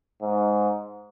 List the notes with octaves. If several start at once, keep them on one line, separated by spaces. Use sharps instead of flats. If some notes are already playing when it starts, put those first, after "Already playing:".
G#2